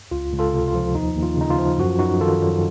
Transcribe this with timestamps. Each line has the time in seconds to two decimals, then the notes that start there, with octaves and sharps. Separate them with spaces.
0.11 C#2 F4
0.33 C#2
0.39 F4 A4
0.53 C3
0.68 F4
0.75 F3
0.95 D#2 D#4
1.16 D#2
1.22 F4
1.37 C#3 D#4
1.50 F4
1.58 F3
1.78 F#2 F#4
1.89 F4
1.99 F#2 D#4 F#4
2.21 D#3 F4 A4
2.42 F#3